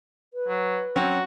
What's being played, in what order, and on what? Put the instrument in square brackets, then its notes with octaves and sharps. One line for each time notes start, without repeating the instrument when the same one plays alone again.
[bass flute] B4
[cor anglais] F#3
[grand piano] F#3 C4 C#4 [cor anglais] F#4